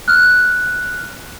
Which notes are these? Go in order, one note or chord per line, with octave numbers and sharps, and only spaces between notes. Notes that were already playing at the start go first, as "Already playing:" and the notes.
F6 F#6